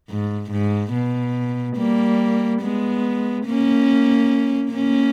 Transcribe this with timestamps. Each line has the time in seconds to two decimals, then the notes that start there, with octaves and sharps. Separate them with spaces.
0.10 G#2
0.51 G#2
0.93 B2
1.77 G3 A#3
2.62 G#3 B3
3.46 A#3 C#4
4.72 A#3 C#4